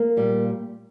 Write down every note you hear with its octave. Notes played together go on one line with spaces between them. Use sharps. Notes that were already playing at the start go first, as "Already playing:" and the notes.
Already playing: A#3
A#2 G3